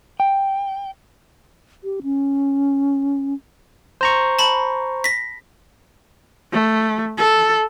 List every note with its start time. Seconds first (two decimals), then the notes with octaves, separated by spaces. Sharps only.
0.20 G5
1.84 G4
2.03 C#4
4.01 C5 A#5 C#6
4.39 A5 B5
5.04 A#6 B6
6.52 A3
7.17 A4